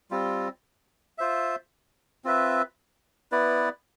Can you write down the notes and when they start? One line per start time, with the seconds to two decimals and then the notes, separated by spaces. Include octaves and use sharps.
0.11 G3 C4 F4
1.18 F4 C5 E5
2.25 C4 F4 B4 E5
3.32 B3 E4 B4 D5